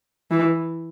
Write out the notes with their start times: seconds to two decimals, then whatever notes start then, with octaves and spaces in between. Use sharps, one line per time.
0.31 E3